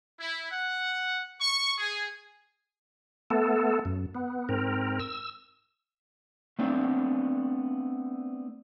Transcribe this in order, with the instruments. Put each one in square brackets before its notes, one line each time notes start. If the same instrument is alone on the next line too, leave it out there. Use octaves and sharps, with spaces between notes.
[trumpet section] E4
F#5
C#6
G#4
[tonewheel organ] A3 B3 A4
F#2
B3
G#2 C4 A#4
E6
[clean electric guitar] A3 B3 C4 D4